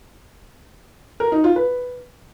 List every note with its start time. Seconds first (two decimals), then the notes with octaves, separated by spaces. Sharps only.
1.20 A#4
1.32 D#4
1.44 F4
1.56 B4